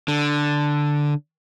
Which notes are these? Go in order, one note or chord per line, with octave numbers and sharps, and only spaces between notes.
D3